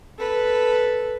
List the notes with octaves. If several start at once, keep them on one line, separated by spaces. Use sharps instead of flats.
A4 B4